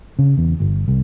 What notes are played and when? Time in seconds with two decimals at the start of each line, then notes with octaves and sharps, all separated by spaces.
0.19 C#3
0.38 E2
0.60 G1
0.88 C2